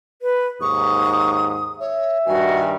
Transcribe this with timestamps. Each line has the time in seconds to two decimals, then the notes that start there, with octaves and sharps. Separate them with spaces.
0.22 B4
0.61 D#2 G#2 C#6 D#6
1.80 C#5 E5
2.26 G2 D#3 G3 F#4 G#5